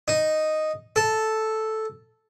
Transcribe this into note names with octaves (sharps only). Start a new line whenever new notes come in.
D#4
A4